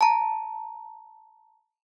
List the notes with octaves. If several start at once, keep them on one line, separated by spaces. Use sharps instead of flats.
A5 A#5